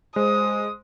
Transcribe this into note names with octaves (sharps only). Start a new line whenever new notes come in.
G#3 C5 D#6